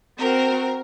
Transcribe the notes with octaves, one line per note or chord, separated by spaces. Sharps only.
C4 F#4 A#4